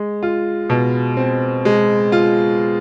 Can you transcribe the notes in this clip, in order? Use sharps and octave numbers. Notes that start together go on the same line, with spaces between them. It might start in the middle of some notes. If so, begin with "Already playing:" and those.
Already playing: G#3
F4
B2
C4
G#3
F4